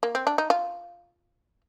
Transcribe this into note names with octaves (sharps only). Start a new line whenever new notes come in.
A#3
C4
D4
D#4
F4